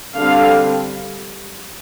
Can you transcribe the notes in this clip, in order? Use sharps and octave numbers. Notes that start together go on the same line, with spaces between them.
D3 G3 C4 F5